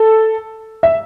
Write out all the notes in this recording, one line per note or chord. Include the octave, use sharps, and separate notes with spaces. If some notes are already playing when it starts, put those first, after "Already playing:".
Already playing: A4
E5